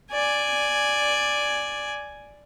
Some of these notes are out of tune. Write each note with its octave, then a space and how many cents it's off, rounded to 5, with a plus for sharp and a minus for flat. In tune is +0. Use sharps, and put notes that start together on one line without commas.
D5 +0 G#5 +0